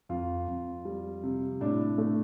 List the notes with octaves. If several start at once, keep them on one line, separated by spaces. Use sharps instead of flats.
F2 F4
F2
G3
C3
A2 D4
A3